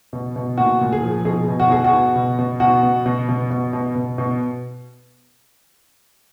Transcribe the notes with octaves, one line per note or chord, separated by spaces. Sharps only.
B2
B2
A#2 F#4
A#2
G#4
F3
B2 G#4
B2
F#4
B2 G#4
F#4
B2
B2
B2
B2 F#4
B2
B2
B2
B2
B2
B2
B2